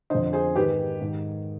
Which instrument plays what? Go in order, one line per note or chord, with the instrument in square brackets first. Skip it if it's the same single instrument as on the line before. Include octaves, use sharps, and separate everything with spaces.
[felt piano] F2 D3 C5 D#5
G#4 C5
G#2 D#3 G4 B4
G#2 D#3